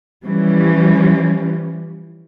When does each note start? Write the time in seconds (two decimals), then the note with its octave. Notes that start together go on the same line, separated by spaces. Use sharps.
0.24 E3 F3 G3 C#4